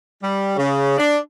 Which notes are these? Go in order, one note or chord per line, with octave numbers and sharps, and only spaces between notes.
G3
C#3
D4